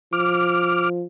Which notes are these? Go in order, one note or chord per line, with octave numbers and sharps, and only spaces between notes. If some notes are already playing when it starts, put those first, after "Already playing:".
F3 D6 F6